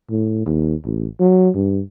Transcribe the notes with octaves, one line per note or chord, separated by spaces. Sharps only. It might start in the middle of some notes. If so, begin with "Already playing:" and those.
A2
D#2
A1
F#3
G2